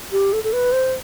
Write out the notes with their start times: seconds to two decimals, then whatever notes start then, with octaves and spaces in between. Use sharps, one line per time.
0.12 G4
0.33 A4
0.44 A4
0.53 B4
0.72 C5